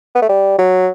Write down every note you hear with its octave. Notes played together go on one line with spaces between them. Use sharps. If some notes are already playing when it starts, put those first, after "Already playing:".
B3
A3
G3
F#3